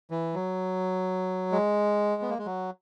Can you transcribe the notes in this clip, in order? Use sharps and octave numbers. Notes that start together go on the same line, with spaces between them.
E3
F#3
G#3
B3
A#3
G#3
F#3